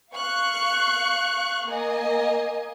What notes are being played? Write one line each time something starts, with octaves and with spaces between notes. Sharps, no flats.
F5 C#6 F#6 C#7
A#3 D#5 G#5